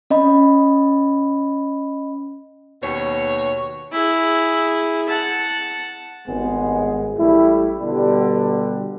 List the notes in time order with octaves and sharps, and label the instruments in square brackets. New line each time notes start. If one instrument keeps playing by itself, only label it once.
[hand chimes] C#4 D#5 B5
[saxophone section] D#2 B2 C#5
[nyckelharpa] E4 G#4
F#5 A5
[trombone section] G#1 G2 G#3 B3 G#4
A1 G3 A3 E4
B2 D3 G3